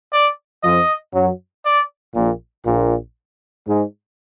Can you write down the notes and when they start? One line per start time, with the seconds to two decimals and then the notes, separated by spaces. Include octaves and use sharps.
0.13 D5
0.63 F2 F3 D#5
1.14 F#2 F#3
1.65 D5
2.15 A#1 A#2
2.66 A#1 A#2
3.67 G#2 G#3